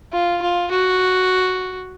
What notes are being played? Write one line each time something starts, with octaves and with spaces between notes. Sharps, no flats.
F4
F4
F#4